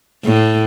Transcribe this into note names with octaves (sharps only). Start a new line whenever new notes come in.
A2